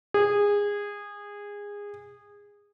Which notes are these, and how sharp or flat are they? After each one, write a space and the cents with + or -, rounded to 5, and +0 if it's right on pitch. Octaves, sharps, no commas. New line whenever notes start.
G#4 -20